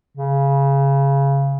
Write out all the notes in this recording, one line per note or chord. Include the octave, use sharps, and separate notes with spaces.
C#3